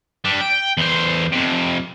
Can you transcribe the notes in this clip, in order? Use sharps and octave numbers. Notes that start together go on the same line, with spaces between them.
G3 D4
G5
E2 C5
F2 C3